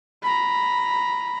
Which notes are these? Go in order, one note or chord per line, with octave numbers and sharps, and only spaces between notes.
A#5 B5